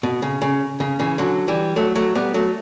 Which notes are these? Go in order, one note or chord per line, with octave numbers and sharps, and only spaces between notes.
B2
C#3
C#3
C#3
C#3 E3
D3 F#3
E3 G3
F#3 A3
F#3 A3
G3 B3
F#3 A3